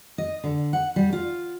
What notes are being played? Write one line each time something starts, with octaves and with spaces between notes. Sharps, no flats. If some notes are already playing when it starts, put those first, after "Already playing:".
D#5
D3
F#5
G3
F4